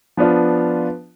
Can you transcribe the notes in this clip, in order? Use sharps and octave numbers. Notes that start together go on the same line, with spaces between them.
F3 B3 D4 F4